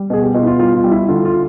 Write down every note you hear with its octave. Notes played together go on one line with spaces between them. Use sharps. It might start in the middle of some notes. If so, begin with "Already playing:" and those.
Already playing: G3
B2 G#4
G4
B2 F4
E4
F4
G3 F4
F4
G3
E4
D3 F4
F4